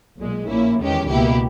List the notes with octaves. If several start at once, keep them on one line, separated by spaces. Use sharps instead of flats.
B1 A#2 G#3
A#1 A#2 A#3 C#4 E4
E2 D#3 G#3 C#4 G4
C#2 B2 A#3 E4 G4